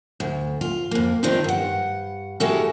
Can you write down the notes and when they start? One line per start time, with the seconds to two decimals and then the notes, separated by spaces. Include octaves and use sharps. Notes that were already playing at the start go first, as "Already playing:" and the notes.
0.20 D2
0.61 F4
0.91 F2 A#3
1.23 D#3 C4 D4 D#4 F4
1.44 G2 F#5
2.40 G#3 E4 F#4 G4 A4 A#4